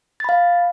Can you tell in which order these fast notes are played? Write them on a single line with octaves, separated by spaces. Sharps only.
A6 B5 F5